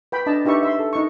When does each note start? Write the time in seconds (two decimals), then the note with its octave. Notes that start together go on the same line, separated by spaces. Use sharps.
0.12 B4 G5 B5
0.26 D4 D#5 A5
0.45 D4 D#4 G4 B4 E5 C#6
0.63 E5 C6
0.79 A4
0.93 D#4 C#6